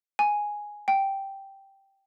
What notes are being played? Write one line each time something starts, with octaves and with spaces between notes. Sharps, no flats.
G#5
G5